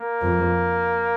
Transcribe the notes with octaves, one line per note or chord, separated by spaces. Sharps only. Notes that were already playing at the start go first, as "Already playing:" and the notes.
Already playing: A#3
F2